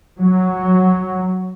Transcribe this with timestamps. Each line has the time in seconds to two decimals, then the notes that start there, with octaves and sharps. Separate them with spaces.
0.19 F#3